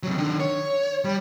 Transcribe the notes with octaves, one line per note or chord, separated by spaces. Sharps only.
C3 F#3
D#3 D4
C#5
G3